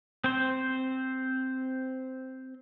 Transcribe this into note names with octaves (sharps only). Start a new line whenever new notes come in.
C4 C5